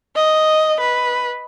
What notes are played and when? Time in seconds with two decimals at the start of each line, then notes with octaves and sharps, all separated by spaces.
0.16 D#5
0.80 B4